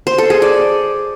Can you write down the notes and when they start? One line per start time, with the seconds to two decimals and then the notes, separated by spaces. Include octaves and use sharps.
0.07 C5
0.18 A4
0.30 G#4
0.42 D5